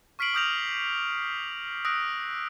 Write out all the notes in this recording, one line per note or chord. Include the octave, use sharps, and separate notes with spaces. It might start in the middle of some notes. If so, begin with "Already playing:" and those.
C#6 F6 B6 C7 D7 F#7
D6 D#6 F6 G6 A#6 F7
D#6 E6 F#6 A#6 D7